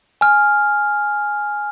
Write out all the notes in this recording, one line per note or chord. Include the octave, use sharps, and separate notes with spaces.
G#5 F6